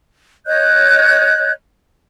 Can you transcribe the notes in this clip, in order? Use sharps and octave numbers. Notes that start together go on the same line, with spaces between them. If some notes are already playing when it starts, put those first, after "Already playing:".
C#5 D#5 F#6 G6